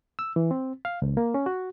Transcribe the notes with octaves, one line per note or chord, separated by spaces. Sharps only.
E6
E3
C4
F5
C#2
A#3
C#4
F#4